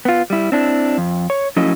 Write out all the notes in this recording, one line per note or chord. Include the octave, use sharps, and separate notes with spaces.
B3 F4
G3 E4
C4 D4 E4
F2
C#5
F3 F#3 A3 C#4 E4 D#5